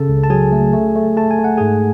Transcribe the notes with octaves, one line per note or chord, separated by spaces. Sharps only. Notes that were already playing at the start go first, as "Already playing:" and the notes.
Already playing: C#3 A4 A5
C#2
A5
F#3 G#4 G#5
A3
A3
A3
A3 A5
G#5
A3
F#5
G#2 G#4 G#5